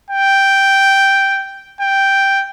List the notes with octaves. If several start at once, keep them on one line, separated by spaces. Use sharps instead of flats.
G5
G5